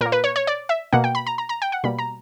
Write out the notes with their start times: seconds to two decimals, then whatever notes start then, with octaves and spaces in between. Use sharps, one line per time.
0.01 A#2 A#3 A#4
0.12 B4
0.24 C#5
0.36 C#5
0.47 D5
0.69 E5
0.93 B2 A#3 F#5
1.04 G5
1.15 B5
1.27 A#5
1.38 A#5
1.49 A#5
1.62 G5
1.72 F#5
1.84 B2 G3 A#3 B5
1.99 A#5